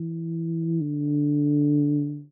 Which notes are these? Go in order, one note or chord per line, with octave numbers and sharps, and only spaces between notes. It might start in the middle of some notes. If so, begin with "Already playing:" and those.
Already playing: E3
D3